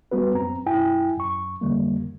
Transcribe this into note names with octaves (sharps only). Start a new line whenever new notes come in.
G3 B3 F#4 B4
F#2 C4 A#5
F#2 E4 G5 G#5
F#2 C#6
F2 D3 G3 A#3